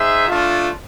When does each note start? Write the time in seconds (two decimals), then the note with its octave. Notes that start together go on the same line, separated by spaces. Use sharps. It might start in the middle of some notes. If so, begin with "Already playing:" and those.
Already playing: D#4 G#4 C5 E5
0.27 A3 D4 F4